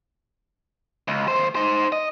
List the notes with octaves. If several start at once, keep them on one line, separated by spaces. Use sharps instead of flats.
C#2
D#2 C5
D#4 C5
D#5